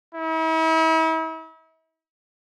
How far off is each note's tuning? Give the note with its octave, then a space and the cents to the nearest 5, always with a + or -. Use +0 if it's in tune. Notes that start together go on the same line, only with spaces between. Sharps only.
E4 -40